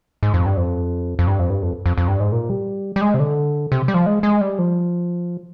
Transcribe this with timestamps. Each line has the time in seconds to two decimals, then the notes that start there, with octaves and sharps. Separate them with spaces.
0.23 G#2
0.34 F2
0.46 G2
0.57 F2
1.19 F2
1.27 G2
1.39 F2
1.50 G2
1.63 F2
1.86 F2
1.98 F2
2.08 G2
2.20 G#2
2.32 A#2
2.50 G3
2.96 G3
3.01 G#3
3.14 C3
3.20 D3
3.72 C3
3.88 G3
3.94 F3
4.06 G#3
4.23 G#3
4.41 G3
4.59 F3